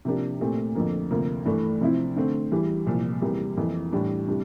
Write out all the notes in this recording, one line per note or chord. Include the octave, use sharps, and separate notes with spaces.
C3 F3 A#3 D4 G4
A#2 A3 C4 G4
F2 D3 F3 A#3
D2 C3 F3 A#3
G2 E3 A3
C3 F3 C4 E4
D3 A3 C4
E2 E3 G3
C2 A#2 F3
E2 C3 G3 A#3
F2 E3 A#3
A2 E3 G3 D4
C3 G3 D4